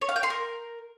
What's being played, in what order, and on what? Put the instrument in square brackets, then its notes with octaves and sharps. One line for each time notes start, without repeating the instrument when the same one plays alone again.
[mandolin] C#5
F5
G5
C6
A#4